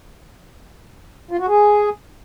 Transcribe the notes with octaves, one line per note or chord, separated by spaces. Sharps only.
F4
F#4
G#4